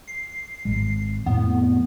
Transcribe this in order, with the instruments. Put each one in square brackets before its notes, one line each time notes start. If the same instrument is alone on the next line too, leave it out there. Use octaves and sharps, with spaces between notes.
[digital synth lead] C7
[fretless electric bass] G#1 G#3
[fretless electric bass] F2 A2 [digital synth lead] B3